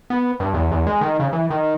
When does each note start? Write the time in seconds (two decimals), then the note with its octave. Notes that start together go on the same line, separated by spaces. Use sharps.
0.10 B3
0.40 G2
0.54 E2
0.71 E2
0.87 G#3
1.01 D#3
1.20 C#3
1.33 E3
1.50 D#3